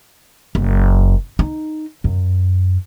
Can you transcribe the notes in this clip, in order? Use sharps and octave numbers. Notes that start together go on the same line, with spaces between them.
F#1
D#4
F#2